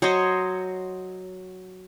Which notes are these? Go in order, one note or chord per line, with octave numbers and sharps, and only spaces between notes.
F#3 C5 C#5 D#5